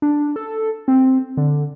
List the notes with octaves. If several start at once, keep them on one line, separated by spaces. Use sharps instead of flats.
D4
A4
C4
D3